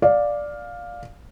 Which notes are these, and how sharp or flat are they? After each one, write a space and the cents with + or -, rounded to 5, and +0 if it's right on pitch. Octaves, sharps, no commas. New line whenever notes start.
D5 +0 F5 +10